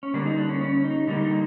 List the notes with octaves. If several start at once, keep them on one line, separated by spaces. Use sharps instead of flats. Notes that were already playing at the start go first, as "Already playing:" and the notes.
C#4
D3 G3 A#3 D4
D#4
D4
C#4
C#4
D#4
D3 G3 A#3 D#4
D#4